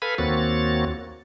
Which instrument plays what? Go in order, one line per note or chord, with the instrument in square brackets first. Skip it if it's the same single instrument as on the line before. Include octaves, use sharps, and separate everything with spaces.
[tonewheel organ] A4 B4 F5 G#5 B5
D#2 A#3 C4 F#4 C#5 A6